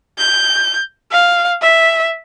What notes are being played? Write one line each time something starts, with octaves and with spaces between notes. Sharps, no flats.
G6
F5
E5